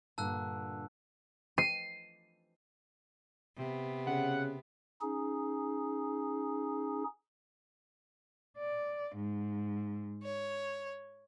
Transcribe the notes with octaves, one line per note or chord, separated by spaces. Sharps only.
G2 A#2 D3 A5 E6 F#6
C7 D#7
C3 B3
C#3 F#5
C#4 D#4 G#4
D5
G#2
C#5